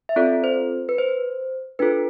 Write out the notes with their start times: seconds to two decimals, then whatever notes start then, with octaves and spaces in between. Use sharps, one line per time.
0.09 E5
0.16 C4 F4 A4 D5
0.44 C5
0.89 B4
0.98 C5
1.79 D4 F4 A4 B4